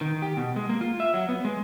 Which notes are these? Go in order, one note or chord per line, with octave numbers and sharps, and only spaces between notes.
D#3
G4
B2
G#3
A#3
F4
E5
F#3
B3
G#3